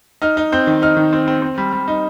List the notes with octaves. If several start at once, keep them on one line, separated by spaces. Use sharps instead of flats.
D#4 F6
D#4
C4 G6
D#3
D#4 F6
D#3
C4
C4
C4
G3
G3
D#4